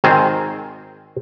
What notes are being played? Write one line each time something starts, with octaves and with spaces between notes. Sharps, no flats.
G#1 D#3 C4 G#4